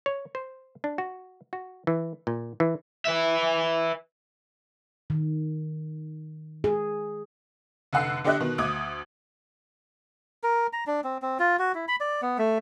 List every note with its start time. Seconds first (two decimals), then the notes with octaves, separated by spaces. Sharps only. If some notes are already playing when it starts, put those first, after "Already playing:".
0.06 C#5
0.35 C5
0.84 D4
0.98 F#4
1.53 F#4
1.87 E3
2.27 A#2
2.60 E3
3.05 B4 E5
5.10 D#3
6.64 G#4
7.93 F1 D3 F#5 E6 C7
8.24 D3 D4 G4 D#5 E5 F#6
8.40 B2 D#3
8.58 D2 D6 D#6 G#6
10.43 A#4
10.73 A#5
10.87 D4
11.04 C4
11.22 C4
11.39 F4
11.59 F#4
11.75 E4
11.88 B5
12.00 D5
12.22 B3
12.38 A3